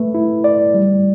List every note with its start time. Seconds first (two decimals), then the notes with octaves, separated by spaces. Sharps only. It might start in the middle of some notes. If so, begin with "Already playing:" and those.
Already playing: A3 B4
0.15 E4
0.44 D5
0.75 G3